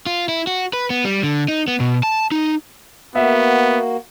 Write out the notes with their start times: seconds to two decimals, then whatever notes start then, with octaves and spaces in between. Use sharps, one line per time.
0.06 F4
0.29 E4
0.47 F#4
0.73 B4
0.90 B3
1.05 G3
1.23 D3
1.48 D#4
1.68 B3
1.80 B2
2.03 A5
2.32 D#4
3.15 A#3 B3 F#4 E5